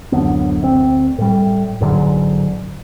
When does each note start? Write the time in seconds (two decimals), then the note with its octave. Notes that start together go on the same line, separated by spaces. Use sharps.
0.12 D1 F#2 D3 B3
0.63 D2 C4
1.18 A2 G3
1.81 A1 G#2 D3 F#3